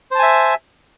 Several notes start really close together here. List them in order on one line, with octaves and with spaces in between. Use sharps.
C5 A5 G#5 E5